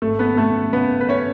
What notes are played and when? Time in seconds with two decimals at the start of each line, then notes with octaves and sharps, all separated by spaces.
0.02 G#1 A3 A4
0.19 B3 B4
0.37 F#2 A3 A4
0.73 C#3 B3 B4
1.01 B4
1.09 C#4 C#5